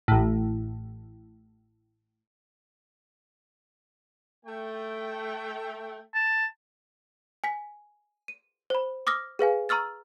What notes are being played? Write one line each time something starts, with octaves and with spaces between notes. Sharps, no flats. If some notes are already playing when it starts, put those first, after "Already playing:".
A1 A2
A3 G5
A5
G#5 B6
D#7
C5 B5
D6 D#6 F6 A#6
G#4 B4 F5 G#5
A#5 C#6 E6 F6 A6